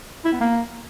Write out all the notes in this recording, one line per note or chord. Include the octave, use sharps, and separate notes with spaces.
E4
B3
A#3